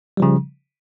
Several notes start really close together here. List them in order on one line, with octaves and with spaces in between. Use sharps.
G3 F3 C#3